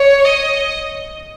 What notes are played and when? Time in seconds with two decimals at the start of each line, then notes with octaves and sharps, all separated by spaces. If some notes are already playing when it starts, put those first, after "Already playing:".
Already playing: C#5
0.25 D#5